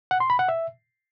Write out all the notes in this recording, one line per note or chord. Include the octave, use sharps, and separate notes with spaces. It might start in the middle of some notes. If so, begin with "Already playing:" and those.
F#5
C6
B5
F#5
E5